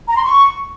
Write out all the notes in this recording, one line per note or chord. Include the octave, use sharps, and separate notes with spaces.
A#5
C6
C#6